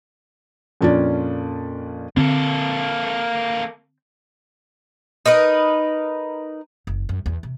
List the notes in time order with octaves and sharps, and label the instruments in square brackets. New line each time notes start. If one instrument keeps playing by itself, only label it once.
[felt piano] F2 A#2 C#4 D4 F4 D5
[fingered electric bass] D3 C4 [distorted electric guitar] A#3 A4
[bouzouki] D#4 A#4 B4 D#5
[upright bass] F#1
F#2
E2
C3